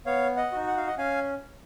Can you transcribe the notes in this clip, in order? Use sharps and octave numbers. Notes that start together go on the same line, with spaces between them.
B3 C#5 F5
D#5 F#5
D#4 F#4
F#5
F5
D#5 F#5
C#4 F5 G#5